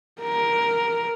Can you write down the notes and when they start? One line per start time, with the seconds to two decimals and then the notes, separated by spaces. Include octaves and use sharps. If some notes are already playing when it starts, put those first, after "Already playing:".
0.22 A#4